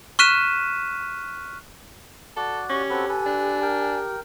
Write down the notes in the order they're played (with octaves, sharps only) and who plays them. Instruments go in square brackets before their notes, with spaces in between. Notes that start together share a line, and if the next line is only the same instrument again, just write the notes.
[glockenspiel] C#6 F6 F#6 B6 D#7 E7
[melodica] F#4 D5 [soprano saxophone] A4
[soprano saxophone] C#4 [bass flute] G4 [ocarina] C#6
[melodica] C4 F#4 A4 [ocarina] B5
[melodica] A4 B4 [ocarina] G#5
[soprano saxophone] D4
[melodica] A#4 G5